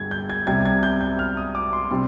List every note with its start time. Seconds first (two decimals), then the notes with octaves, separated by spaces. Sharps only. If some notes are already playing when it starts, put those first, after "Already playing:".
Already playing: G1 G2 G#3 G#6
0.11 G6
0.30 G#6
0.47 C2 C3 G3 G#6
0.65 G#6
0.83 G6
1.01 G6
1.19 F6
1.37 D#6
1.55 D6
1.73 C6
1.91 C3 G3 C4 C6